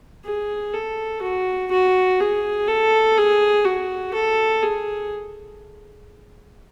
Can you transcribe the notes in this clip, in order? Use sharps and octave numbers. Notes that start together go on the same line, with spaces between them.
G#4
A4
F#4
F#4
G#4
A4
G#4
F#4
A4
G#4